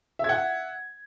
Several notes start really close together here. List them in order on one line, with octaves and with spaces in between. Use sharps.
E5 G#6 F#5